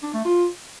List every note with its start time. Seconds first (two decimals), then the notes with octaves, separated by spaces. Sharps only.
0.03 D4
0.14 A3
0.25 F4